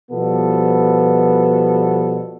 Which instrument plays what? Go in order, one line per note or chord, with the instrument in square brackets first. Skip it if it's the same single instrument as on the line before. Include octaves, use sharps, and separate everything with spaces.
[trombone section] B2 F3 G3 B3 A4